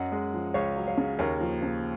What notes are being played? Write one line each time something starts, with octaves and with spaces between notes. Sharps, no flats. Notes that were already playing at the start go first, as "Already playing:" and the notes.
Already playing: F#2 D#5 F#5
G#3
F3
C#2 C#5 F5
F#3
C#5 F5
C#3
D#2 A#4 C#5
F3
C#3